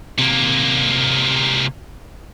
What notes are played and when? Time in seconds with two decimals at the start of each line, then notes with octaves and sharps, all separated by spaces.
0.18 C3 A#3